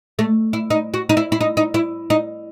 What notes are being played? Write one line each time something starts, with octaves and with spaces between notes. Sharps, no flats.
A3
E4
D#4
F#4
D#4
E4
E4
D#4
D#4
E4
D#4